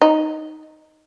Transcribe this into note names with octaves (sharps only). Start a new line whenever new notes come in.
D#4